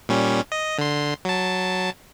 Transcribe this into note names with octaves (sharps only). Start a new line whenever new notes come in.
A#2 G3 C#4
D#5
D3 C6
F#3 A5